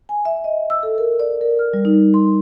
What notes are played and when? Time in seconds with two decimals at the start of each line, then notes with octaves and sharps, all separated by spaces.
0.09 G#5
0.25 E5
0.44 D#5
0.70 E6
0.83 A4
0.98 A#4
1.20 D5
1.41 A#4
1.59 F6
1.73 G3
1.85 D#4
2.14 C6